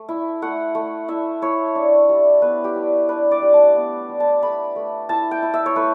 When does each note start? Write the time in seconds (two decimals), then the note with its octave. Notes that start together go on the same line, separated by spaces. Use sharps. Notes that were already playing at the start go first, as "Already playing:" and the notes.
Already playing: A3
0.09 E4
0.42 A3 F#5
0.75 A3
1.08 E4 E5
1.42 E4 C#5
1.75 D4
2.09 G3
2.42 B3 B4
2.64 G4
2.75 G3
3.09 D4 B4
3.31 D5
3.42 G3
3.54 A5
3.76 B3
4.09 G3
4.20 A5
4.42 A3 B5
4.76 A3
5.09 E4 A5
5.31 G5
5.42 E4
5.54 E5
5.66 C#5
5.76 A3 B4